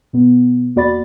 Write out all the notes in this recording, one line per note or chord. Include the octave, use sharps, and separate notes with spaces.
B2 B3
E2 A#3 F#4 D5 B5 A6